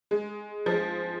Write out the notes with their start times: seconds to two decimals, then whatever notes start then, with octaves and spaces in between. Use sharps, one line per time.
0.11 G#3
0.66 F3
0.72 G#3